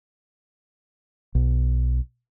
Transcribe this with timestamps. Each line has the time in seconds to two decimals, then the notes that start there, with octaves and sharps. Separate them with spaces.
1.35 B1